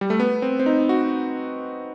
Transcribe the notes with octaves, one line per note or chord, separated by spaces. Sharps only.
G3
A3
B3
C4
C4
D#4
F#4